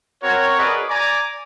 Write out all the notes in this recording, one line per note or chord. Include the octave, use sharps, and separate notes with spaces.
C4 F#4 A#4 C#5
F#4 G#4 A#4 B4 D5 D#5
D5 G#5 A#5 D6